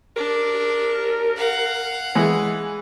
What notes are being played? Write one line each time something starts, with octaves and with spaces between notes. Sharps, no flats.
D4 A#4
F5 F#5
E3 G#3